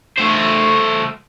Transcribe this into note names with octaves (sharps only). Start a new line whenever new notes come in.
A3 C5